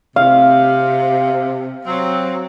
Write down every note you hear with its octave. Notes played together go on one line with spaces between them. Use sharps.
C3 F5
F#3 C4